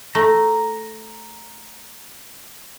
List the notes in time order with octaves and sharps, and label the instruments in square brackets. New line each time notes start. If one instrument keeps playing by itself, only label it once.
[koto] A3 [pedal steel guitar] A#5